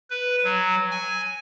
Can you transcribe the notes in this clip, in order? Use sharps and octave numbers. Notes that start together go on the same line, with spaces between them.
B4
F#3
G#5